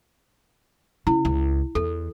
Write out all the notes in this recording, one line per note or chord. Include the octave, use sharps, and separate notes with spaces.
C#3 E4
C#2
E2 A4